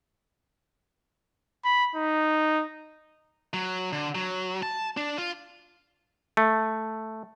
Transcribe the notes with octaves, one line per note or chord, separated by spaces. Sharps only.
B5
D#4
F#3
D3
F#3
A5
D4
F4
A3